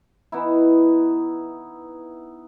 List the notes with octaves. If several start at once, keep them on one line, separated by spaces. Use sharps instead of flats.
E3 B3 D#4 E4